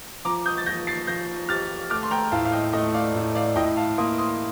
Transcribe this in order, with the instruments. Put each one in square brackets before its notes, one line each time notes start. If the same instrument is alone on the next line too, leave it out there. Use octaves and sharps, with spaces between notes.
[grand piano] F3 [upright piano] A#5 D6
[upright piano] D#6 G6
A6
[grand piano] F3 [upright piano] G6 A#6
[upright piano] A6 C7
[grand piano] F3 [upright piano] G6 A#6
[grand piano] G4 [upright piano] F6 A6
[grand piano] A3 [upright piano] D6 F6
[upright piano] C6
G5 A#5
[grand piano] A2 [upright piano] F5 A5
[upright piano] F5
D#5 G5
[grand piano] A3 [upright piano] D#5
[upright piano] D5 F5
[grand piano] A2
[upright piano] D5 F5
[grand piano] A2 [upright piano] D#5 G5
[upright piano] F5 A5
[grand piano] A#3 [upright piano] C6 D#6
[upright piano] C6 D#6